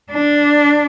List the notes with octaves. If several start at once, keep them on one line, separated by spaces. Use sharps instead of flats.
D4